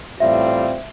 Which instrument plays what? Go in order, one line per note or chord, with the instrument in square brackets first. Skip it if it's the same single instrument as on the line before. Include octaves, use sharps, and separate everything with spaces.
[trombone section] A1 A2 G3 C4 F4 [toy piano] E5